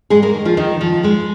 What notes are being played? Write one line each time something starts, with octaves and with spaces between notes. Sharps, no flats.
G#2 G#3 G#4
A#3 A#4
D#3
F3 F4
D#2 D#3 D#4
C#3 F3 F4
G#2 G#3 G#4